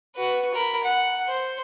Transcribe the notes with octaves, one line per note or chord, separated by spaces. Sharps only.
F#4 B4
A#4 B5
F#5
C5